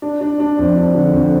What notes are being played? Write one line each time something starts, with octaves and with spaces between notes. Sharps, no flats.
D4
D4
D4
F2
D4
D3
F2